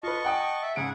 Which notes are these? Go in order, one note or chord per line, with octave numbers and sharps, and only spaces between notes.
F4 B4 D#5 A5 C#6
F#5 G5 D#6
E5
G#2 C#3 G#4 F#5 D7